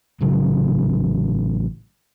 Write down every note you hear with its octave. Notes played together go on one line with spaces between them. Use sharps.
A1 C#3 F#3